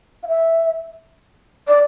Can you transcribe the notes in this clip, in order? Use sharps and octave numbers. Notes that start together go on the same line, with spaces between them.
F5
E5
D5